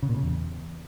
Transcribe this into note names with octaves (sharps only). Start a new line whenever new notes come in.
C#3
A#2
C#3
E2